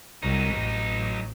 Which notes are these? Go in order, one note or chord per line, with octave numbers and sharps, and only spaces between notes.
C2 F#3 D#4
A1